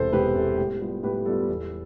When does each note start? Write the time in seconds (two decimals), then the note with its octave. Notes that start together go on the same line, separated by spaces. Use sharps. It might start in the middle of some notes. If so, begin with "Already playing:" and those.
Already playing: E1 E2 C3 A4 C5
0.13 E1 G4 B4
0.35 E2 C3 A4
0.58 A2 G4
0.81 G3 B3 F4
1.03 A2 G4 B4
1.26 G3 B3 F4 A4
1.48 E2